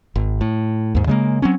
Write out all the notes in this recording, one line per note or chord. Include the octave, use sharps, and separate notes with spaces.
G#1
A2
D#2 G#2
C#3 G#3 A#3
F#3 C4 C#4